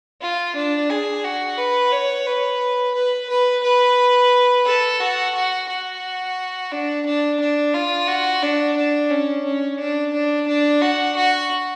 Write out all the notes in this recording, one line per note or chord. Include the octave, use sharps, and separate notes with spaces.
F4
D4
G#4
F#4
B4
C#5
B4
B4
B4
B4
A4
F#4
F#4
F#4
D4
D4
D4
F4
F#4
D4
D4
C#4
C#4
D4
D4
D4
F#4
F#4